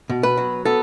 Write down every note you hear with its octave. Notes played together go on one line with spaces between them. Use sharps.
B2
B4
F#3
B3 A4